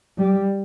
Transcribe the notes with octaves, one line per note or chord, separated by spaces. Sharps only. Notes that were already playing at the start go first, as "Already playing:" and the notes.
G3